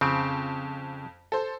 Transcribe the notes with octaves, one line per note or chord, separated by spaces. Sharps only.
F2 C#3 C4 D7
A4 C5